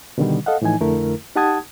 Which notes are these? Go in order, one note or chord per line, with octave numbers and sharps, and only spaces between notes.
B2 D3 D#3 G3
A4 D#5 F5 F#5
A2 E3 F3 D#4 G#5
F2 D3 A3 E4 A#4
D#4 G4 F#5 A5 D#6 G#6